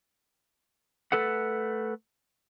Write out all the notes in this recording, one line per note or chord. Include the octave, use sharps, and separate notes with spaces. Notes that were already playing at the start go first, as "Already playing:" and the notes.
A3 A4 B4 F#5